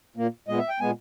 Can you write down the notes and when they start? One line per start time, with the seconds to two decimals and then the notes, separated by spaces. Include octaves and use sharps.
0.16 A#2 A#3
0.48 A#2 G#3 B3 D#5
0.59 E5
0.69 G5
0.80 A#2 G#3 B3 G#5